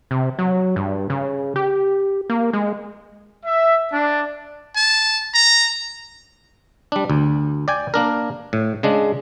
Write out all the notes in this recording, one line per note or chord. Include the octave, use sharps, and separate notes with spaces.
C3
F#3
G2
C#3
G4
A#3
G#3
E5
D4
A5
A#5
G3 D4
D2
D5 G5 G#5
A#3 D4 A#4
A2
C#3 G#3 D4